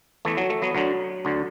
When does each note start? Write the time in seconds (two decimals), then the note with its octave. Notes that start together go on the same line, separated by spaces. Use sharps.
0.25 E2 E3 A3
0.37 F#3
0.50 A3
0.62 F#3 B3
0.75 D2 D3 F#3
1.25 D2 D3